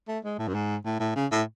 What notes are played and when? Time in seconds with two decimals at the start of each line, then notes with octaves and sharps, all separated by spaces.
0.08 A3
0.24 G#3
0.39 A2
0.48 F#2
0.54 G#2
0.85 A2
1.00 A2
1.16 C#3
1.32 A2